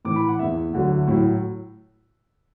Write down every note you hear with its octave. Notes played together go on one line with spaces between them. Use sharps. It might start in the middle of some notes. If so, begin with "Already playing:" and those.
A2 E3 D6
B5
F#5
E2 E3 E5
D2 D3 F#3
A2 F#3 E4